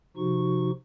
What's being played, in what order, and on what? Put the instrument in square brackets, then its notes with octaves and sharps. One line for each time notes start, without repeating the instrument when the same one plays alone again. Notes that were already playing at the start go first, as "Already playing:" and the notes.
[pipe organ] C3 F3 D#4 F#4 C#6